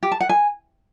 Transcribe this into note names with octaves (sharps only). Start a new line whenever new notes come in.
G4
A5
F#5
G#5